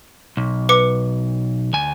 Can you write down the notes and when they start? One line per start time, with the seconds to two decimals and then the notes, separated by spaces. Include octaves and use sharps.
0.37 B1
0.69 B4 D6 C#7
1.73 D2 G#5